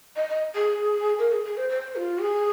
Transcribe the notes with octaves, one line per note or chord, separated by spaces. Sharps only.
D#5
D#5
G#4
A#4
G#4
G#4
C5
C5
F4
G#4